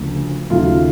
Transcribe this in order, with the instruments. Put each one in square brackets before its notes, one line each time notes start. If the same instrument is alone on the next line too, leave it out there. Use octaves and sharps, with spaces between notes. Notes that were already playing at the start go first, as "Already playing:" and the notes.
Already playing: [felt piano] D2 C#3 F3 A#3
D#2 C#3 F#3 A3 F4